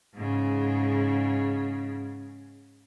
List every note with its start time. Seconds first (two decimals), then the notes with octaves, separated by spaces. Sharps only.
0.14 G#2 C#3